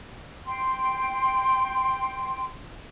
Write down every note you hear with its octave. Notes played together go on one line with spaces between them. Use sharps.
G5 C6